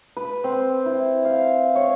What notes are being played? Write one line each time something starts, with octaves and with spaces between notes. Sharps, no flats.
B4
C4
E4
F5
C#5